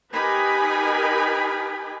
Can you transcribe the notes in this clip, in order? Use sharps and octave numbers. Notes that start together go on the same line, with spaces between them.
D#4 G4 A#4 B4 G#5 B5